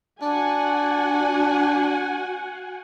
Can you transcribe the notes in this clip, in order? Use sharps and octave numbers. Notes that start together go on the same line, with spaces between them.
D4 F#4 F#5 G#5